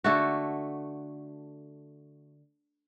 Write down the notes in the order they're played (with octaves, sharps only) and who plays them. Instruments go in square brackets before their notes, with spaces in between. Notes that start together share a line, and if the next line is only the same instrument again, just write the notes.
[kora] D3 A3 F#4